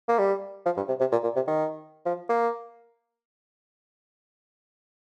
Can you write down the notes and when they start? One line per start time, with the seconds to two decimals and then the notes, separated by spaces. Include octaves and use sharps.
0.09 A#3
0.19 G3
0.66 F3
0.77 G2
0.88 C3
1.00 C3
1.12 A#2
1.24 A#2
1.36 C3
1.48 D#3
2.06 F3
2.29 A#3